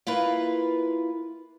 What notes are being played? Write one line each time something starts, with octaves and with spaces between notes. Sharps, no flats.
A#3 E4 F4 B4